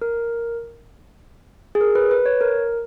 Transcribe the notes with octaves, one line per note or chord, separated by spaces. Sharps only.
A#4
G#4
A#4
B4
B4
C#5
A#4